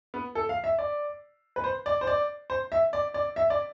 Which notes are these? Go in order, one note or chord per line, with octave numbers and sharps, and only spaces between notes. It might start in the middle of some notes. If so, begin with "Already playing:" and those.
B3
A4
F5
E5
D5
B4
C5
D5
C5
D5
C5
E5
D5
D5
E5
D5